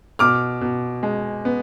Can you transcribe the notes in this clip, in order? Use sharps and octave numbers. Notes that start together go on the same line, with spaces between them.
B2 D6 F6
B2
G#3
B3